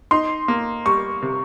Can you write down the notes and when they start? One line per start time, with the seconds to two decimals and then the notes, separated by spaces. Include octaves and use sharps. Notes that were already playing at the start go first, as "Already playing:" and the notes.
0.11 D#4 C6
0.48 A#3
0.85 G3 C#6
1.22 C3